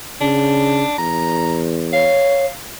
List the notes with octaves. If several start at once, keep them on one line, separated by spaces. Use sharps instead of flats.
C#3 D4
E2 A#5
C#5 F5